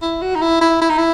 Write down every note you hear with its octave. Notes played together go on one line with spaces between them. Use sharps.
E4
F#4
D#4
E4
E4
E4
D#4
E4